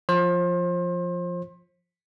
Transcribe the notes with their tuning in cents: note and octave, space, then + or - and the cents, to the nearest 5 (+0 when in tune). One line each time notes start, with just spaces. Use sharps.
F3 +0 C5 +30